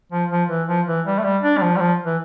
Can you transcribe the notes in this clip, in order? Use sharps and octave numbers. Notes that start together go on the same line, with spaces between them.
F3
F3
E3
F3
E3
G3
A3
G3
D4
G3
F3
G3
F3
E3